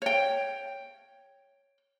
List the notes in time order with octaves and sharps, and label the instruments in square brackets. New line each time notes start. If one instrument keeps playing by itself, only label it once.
[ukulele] C#5 G5